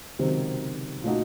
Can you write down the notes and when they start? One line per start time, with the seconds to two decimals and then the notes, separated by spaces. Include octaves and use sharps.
0.19 C#2 C3 D#3 F#3 C4
1.04 A#2 A3 D#4 F#4